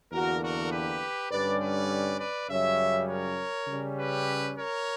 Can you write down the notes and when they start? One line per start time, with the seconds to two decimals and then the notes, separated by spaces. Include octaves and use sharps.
0.12 E2 D3 A#3 F#4 A#4
0.41 F#4 A#4
0.71 G4 B4
1.30 G2 D3 G3 C#4 B4 D5
1.60 B4 D5
2.19 B4 D5
2.48 F#2 C#3 G3 C#5 E5
3.08 A#4 C#5
3.67 C#3 G3 C#4
3.97 G4 B4
4.56 A#4 C#5